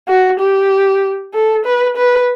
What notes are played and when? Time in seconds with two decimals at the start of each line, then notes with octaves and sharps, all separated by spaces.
0.08 F#4
0.40 G4
1.34 A4
1.65 B4
1.97 B4